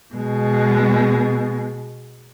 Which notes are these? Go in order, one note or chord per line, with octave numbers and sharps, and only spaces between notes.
B2 G#3